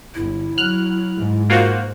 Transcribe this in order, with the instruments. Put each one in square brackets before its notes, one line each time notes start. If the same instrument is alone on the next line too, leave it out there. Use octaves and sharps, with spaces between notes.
[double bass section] G1 [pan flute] E4
[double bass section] F#3 [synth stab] F6 F#6
[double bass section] G#2
[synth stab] A#3 F4 F#4 [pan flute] C5